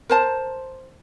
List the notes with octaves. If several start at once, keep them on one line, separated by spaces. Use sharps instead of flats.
A#4 C5 A5